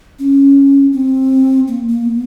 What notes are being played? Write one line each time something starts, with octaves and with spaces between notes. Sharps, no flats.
C#4
C4
A#3
A#3
B3